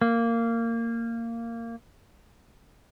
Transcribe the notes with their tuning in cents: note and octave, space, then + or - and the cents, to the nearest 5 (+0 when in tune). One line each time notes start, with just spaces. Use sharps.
A#3 -15